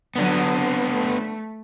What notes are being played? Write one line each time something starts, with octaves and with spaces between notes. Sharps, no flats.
D3 F#3 B3 D4
C4
A3